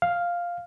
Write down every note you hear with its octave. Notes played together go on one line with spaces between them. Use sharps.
F5